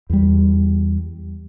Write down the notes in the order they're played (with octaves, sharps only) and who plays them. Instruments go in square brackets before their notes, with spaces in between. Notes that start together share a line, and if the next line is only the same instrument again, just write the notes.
[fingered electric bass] E2 G3